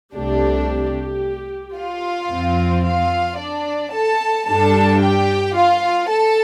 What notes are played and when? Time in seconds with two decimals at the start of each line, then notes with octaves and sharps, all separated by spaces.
0.14 C2 C3 A3 D4 G4
0.68 G4
1.76 F4 F5
2.30 F2 F3 C4
2.84 F4 F5
3.38 D4 D5
3.92 A4 A5
4.47 G2 G3 D4 A4 A5
5.01 G4 G5
5.55 F4 F5
6.09 A4 A5